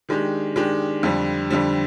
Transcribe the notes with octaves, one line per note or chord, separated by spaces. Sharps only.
D#3 G#3 D4 G4
D#3 G#3 D4 G4
F2 D3 G3
F2 D3 G3